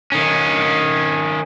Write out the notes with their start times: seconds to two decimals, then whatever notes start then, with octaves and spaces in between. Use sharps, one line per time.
0.12 D#3 C#4